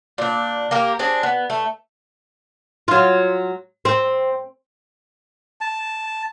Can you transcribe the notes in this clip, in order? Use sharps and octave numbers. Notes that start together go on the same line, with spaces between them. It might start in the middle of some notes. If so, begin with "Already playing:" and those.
A#2 D4
A#3 G4 A#4
C4 D4 G#4
B3
A3
F#3 F4
C4
A5